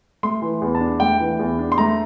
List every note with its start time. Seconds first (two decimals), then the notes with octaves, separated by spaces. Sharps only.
0.23 A3 C6
0.42 E3
0.62 E2
0.75 A5
0.80 D4
1.00 A3 G5
1.20 E3
1.39 E2
1.59 D4
1.72 C6
1.78 A3 A#5